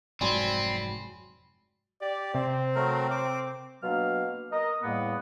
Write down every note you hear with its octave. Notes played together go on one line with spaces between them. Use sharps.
F1 G#2 F#3 C4 D5 G#5 B5 C6
G4 D5
C3 C4
F#3 A3 A#4
D6
B2 F#3 A#3 D4 F5 F6
A#4 D#5
E2 A2 G3 A#3 B3